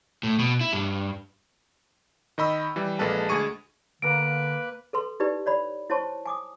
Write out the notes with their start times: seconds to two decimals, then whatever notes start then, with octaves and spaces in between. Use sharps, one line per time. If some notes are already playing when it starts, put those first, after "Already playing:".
0.23 A2
0.39 B2
0.61 E4
0.73 G2
2.38 D#3 D#5 B5 E6
2.76 E3 G3
2.99 A#1 G#3 A#3 A4 B4 A5
3.29 D2 G#3 G#4 C#6 D#7
4.02 D3 A#3 B4 F5 A#5 D7
4.93 A4 B4 C6
5.20 D#4 E4 G4 B4 D5
5.46 C#5 D5 B5
5.90 E4 C5 C#5 A5 C6 C#6
6.26 G#5 D6 D#6